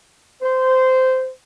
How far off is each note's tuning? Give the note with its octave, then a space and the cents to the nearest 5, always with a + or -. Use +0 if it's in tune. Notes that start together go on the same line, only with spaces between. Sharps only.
C5 -15